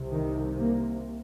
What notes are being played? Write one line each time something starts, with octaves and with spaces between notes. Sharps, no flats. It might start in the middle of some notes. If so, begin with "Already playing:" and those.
Already playing: C2 C3
D#3
A#3